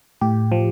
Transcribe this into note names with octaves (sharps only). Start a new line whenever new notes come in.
A2 G4
F3